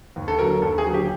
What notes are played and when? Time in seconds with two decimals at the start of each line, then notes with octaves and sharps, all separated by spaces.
0.16 D#2
0.28 A4
0.38 D3 F#3 A#4
0.62 D#2 A4
0.78 G#4
0.86 D3 F#3
0.94 G4